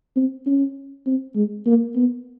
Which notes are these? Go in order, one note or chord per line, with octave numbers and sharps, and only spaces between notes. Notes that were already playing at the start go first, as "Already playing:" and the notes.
C4
C#4
C4
G#3
A#3
B3